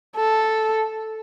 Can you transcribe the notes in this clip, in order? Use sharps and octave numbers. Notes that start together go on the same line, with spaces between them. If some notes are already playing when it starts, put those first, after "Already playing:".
A4